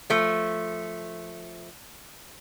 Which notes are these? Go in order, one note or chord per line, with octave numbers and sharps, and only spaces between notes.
F3 A3